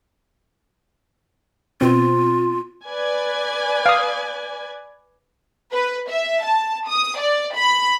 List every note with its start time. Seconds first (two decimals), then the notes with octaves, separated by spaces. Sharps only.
1.81 B2 C4 F4
2.84 B4 D5 G#5
3.86 F5 D#6
5.73 B4
6.10 E5
6.44 A5
6.88 D#6
7.19 D5
7.55 B5